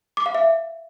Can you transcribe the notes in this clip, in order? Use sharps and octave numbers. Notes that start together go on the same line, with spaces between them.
D6
F5
E5